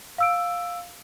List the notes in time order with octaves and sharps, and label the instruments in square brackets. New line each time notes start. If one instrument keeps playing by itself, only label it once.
[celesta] F5 E6 D7